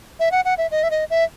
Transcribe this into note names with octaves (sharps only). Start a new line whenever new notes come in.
E5
F#5
F#5
E5
D#5
E5
D#5
E5